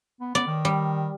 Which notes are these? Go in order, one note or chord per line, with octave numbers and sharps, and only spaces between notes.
B3
B3 D5
D#3
G3